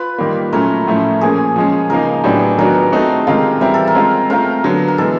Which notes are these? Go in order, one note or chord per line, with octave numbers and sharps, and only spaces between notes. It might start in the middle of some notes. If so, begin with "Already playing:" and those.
Already playing: F4 B4
D#3 G3 A#3
A#2 F#3 A3 C#4 A#4
A2 F3 A3 C#4 E4
A#2 F3 A#3 C#4 G#4
F3 G#3 C#4
C#3 F3 A#3 D#4 A#4
A2 F#3 B3 D4 G4
D#3 F#3 B3 D4 F#4 A#4
A3 C4 D#4 F#4 A4
C3 D#3 G#3 C4 F4 A#4
E3 G3 C4 E4 A#4
A4
A#4
G#3 C4 F4
A3 C4 F4 A#4
D3 F#3 B3
A#4
E3 G#3 B3 A4